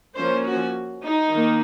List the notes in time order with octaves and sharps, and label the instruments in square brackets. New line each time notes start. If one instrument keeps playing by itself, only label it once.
[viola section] F3 A#3 C#4 C5
F#4
D#4
D#3 A#3